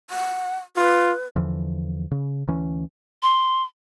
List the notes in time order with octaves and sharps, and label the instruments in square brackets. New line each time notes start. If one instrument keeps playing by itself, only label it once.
[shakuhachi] F#5
[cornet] F4 [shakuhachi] B4
[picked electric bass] E2 D3 E3 F3
C#3
D2 E3 C#4
[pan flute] C6